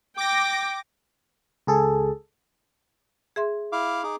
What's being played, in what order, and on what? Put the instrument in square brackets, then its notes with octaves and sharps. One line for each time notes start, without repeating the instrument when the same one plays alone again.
[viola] G5 [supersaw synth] D6 A#6
[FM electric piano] C#2 G#4 A4
[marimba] G#4 E5 C6
[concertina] E4 F5 D6
D#4 G#4 D6